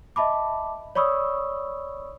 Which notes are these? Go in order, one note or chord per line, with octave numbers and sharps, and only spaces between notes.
D#5 E5 A5 B5 D6
C#5 D5 B5 C#6 D#6 E6